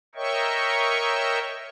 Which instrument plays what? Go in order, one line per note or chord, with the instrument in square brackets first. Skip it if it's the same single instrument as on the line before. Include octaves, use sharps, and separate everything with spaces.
[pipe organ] A#4 C#5 D#5 E5 G5 C#6